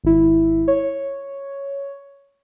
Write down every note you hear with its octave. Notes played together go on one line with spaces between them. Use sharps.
G#1 E4
C#5